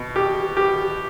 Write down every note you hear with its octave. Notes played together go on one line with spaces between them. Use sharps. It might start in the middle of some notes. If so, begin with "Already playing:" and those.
Already playing: B2
G4
G4